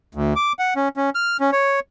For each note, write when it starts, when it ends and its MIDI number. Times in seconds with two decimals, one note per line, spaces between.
0.15 0.34 38
0.36 0.53 86
0.59 0.74 78
0.76 0.88 61
0.97 1.10 61
1.15 1.37 89
1.40 1.50 61
1.52 1.80 73